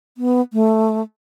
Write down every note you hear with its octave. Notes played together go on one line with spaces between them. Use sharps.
B3
A3